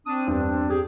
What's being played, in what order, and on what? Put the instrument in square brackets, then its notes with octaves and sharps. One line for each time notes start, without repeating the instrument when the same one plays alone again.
[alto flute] C4 [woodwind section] D4 D#6
[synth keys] E2 [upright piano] G2 [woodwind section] D4
[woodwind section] G4 G#4